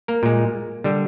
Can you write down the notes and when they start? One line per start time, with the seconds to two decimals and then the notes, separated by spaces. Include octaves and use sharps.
0.08 A#3 A#4
0.23 A#2 G#3
0.84 D3 G3